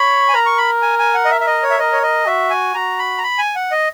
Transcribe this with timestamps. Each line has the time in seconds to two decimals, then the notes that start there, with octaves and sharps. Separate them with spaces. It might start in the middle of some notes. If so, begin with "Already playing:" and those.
Already playing: C#5 B5
0.28 G#5
0.34 A#4 A#5
0.46 C#6
0.58 B5
0.82 G#5
0.99 G#5
1.14 F#5
1.25 D#5
1.30 E5
1.41 E5
1.47 D#5
1.63 C#5
1.70 E5
1.78 A#4 D#5
1.92 C#5
2.02 D#5
2.26 F#4 E5
2.50 G#5
2.74 F#4 A#5
2.99 B5
3.18 A#5
3.23 B5
3.38 G#5
3.55 F#5
3.72 D#5